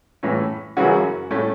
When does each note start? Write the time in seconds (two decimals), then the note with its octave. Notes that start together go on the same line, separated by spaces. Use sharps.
0.23 A2 E3 C#4
0.77 F#2 C#3 E3 C#4 F#4
1.31 A2 A3 C#4